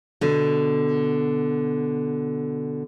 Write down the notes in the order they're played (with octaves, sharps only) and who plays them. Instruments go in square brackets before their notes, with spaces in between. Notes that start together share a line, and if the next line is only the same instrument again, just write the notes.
[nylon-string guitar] B2 D3